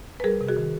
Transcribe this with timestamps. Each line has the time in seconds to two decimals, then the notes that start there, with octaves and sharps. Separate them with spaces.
0.20 B4
0.24 G3 G#4 A#4
0.41 C3
0.48 F#4 G#4
0.57 D#3